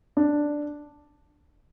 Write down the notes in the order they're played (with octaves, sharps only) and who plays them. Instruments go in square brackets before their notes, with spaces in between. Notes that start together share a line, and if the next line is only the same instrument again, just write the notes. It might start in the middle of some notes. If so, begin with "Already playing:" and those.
[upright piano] D4